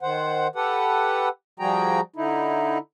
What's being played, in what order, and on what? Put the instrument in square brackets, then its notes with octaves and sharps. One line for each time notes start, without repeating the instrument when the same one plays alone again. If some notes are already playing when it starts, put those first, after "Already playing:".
[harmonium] D#3 C5 F#5
G4 A4 B4 F#5
F3 G3 F#4 G#4 G5 A#5
D3 D#4 E4